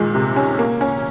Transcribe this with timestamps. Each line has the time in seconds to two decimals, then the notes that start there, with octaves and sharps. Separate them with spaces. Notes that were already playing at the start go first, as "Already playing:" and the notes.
Already playing: A#2 D#3 G#3
0.15 C3
0.36 C#4
0.59 A#3
0.81 C#4